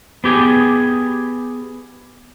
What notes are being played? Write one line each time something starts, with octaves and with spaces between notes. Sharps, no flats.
B3 G4 G#4